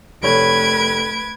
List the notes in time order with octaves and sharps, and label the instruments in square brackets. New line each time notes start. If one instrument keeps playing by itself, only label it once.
[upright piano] F1 C#5 [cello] A3 B4 [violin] G#6 D7